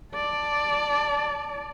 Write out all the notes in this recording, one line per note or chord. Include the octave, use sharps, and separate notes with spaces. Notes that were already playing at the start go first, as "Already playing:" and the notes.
D5 A5